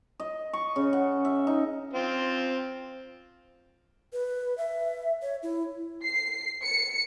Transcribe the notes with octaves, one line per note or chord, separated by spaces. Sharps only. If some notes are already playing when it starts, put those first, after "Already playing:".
D#5
C#6
C#3
F#5
E5
D#4
C4 F4
B4
E5
C#5
E4
C7
C#7